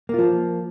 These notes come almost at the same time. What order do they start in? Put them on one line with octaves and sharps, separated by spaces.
A#3 F4 F3